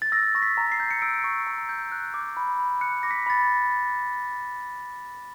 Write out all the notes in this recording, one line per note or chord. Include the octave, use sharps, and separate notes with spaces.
A6
E6 A#6
C#6 A#6
B6
A#5
C7
G6
C#7
E6 D7
C#6
A#5
G6
F#6
D6
B5
B5
F#6 C#7
D6 A#6
B6
B5 A6